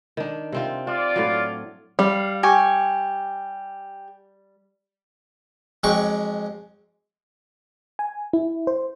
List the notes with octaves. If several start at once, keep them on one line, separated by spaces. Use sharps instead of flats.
D#3 D4
C3 C4 F4
D4 F4 D5
A2 F#3
G3 F5
G4 G#5 C#6
F2 F#3 G#3 G5 C#6 D6
G#5
E4
C5